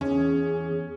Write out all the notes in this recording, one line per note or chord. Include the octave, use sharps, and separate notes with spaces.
E2 C#4 G#4